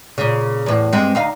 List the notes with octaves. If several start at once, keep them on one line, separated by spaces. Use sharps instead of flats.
A#2 C#3
E2 A2
G2 G#3 C4
D2 D#4 F5